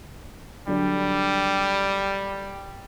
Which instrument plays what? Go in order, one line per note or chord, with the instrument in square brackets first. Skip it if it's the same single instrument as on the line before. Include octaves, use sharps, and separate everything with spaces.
[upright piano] D3 F#3 D4 [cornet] G3